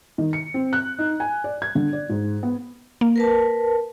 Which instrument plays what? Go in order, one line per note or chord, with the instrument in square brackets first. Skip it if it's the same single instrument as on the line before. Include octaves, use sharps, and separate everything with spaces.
[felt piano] D#3
C#7
C4
F#6
D#4
G#5
D5
G#6
D3
D5
G#2
B3
[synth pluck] A#3
[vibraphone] A#4 B4 A5